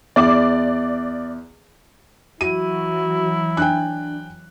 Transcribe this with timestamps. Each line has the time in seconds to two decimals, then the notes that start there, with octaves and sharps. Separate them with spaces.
0.16 E2 D5 D6
2.41 E3 F#3 E4 F#4 D#7
3.57 D4 G5 G#5 F#6